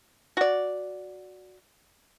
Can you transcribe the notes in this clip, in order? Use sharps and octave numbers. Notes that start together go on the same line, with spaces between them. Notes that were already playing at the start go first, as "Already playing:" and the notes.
F#4 D5